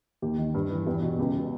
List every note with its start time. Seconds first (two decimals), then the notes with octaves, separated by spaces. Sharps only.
0.22 D#2 G4
0.38 D#3
0.54 G2
0.70 E3
0.86 E2 G4
1.03 B2
1.19 C#2 G4
1.35 B2